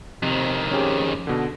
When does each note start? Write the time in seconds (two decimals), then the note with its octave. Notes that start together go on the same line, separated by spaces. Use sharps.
0.22 F2 C3 D#3
0.72 C#4 G4 G#4
1.27 B2 D3